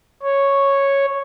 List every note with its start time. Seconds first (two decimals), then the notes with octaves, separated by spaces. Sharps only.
0.23 C#5